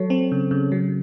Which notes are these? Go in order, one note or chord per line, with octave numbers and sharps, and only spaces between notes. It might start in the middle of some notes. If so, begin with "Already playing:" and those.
Already playing: F#3 A4 C#5
C4
C#3
C#3
F#3